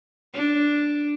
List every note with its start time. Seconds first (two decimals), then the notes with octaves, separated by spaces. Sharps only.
0.34 D4